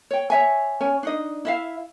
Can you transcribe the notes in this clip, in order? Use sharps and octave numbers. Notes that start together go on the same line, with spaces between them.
C#5 G5
C#5 E5 G#5
C#4 C#5 G#5
D4 D#4 D#5
E4 E5 F5